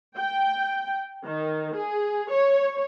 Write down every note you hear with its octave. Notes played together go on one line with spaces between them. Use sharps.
G5
D#3
G#4
C#5